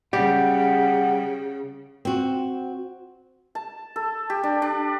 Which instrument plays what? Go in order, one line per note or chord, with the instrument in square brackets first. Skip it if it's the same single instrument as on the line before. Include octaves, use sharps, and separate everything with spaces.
[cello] C#3 [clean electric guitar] G3 [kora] G4 [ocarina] F#5
[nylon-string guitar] C4 F#4
[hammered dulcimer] A5
A4
G4
D4
D4